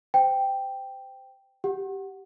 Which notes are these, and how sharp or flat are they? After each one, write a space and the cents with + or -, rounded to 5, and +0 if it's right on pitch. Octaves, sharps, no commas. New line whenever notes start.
C5 -20 G5 +0
G4 -10 F#5 +0